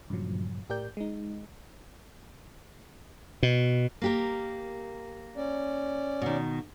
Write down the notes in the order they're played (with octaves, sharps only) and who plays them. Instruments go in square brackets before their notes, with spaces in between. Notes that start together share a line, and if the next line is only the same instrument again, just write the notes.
[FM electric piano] G2 A#2 C#3 F3 F#3
A2 G4 A#4 D5 G5 G6
G#3 D#4
[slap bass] B2
[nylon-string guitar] A#3 G4 A#4
[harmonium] C#4 D5
[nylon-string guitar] B2 D#3